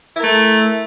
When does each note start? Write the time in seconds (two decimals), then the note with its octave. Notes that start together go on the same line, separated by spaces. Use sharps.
0.15 E4
0.19 A#4
0.23 A3